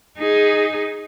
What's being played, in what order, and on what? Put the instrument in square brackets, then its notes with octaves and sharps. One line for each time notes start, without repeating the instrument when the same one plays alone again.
[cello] D#4 G#4